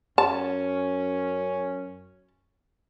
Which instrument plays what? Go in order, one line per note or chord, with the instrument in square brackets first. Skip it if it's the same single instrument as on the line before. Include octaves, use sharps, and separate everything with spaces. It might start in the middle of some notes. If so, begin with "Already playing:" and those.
[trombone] F#2 [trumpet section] C#4 [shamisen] A5